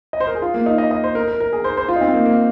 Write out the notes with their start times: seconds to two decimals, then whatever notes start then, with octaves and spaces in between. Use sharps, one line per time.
0.13 D#5
0.20 C5
0.27 A#4
0.35 G#4
0.42 F4
0.54 A#3
0.66 D#4
0.78 D#5
0.91 D#5
1.04 C5
1.15 A#4
1.28 A#4
1.40 A#4
1.53 G#4
1.64 C5
1.77 C5
1.88 F4
1.96 D#4
2.01 C4
2.13 A#3
2.26 A#3